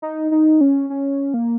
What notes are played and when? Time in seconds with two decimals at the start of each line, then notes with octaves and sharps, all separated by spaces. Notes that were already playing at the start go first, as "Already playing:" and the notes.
0.02 D#4
0.31 D#4
0.61 C#4
0.90 C#4
1.34 A#3